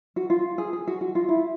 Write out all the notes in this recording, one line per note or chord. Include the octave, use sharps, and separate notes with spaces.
F#4
F4
G#4
G#4
F#4
F#4
F4
E4